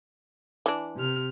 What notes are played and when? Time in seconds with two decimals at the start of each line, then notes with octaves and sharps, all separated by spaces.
0.66 E3 D4
0.95 C3 F6